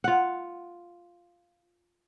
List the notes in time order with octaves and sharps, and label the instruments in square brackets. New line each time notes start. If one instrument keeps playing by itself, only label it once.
[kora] F4 F#5